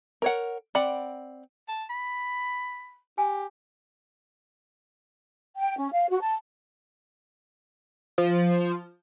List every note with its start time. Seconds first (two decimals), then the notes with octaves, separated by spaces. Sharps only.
0.22 A#4 C#5 F#5
0.75 C4 D5 F#5 B5
1.68 A5
1.90 B5
3.18 G4 G#5
5.56 G5
5.77 C#4
5.92 F5
6.08 F#4
6.21 A5
8.18 F3